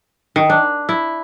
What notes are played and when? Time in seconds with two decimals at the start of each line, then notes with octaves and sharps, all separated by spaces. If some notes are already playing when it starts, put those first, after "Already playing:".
0.36 D#3
0.50 D4
0.89 E4